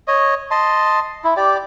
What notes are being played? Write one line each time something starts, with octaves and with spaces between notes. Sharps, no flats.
C#5 D#5
D#5 A5 C6
E4
G4 D5